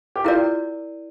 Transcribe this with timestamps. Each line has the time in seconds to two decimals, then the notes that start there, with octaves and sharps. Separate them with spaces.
0.16 G4
0.24 E4 F4 A#4 D5